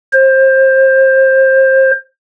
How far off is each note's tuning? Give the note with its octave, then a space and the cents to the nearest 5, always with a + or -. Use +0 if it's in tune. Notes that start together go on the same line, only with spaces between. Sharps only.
C5 +25